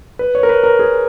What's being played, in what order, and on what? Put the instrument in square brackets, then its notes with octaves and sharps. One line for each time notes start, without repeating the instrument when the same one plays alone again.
[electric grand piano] B4
C#5
A#4
B4
A#4
G#4